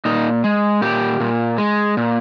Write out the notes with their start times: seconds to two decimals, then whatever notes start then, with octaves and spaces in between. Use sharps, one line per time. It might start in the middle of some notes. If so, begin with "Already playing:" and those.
0.05 A#2 D#4
0.44 G#3
0.81 A#2 G4
1.20 A#2
1.58 G#3
1.97 A#2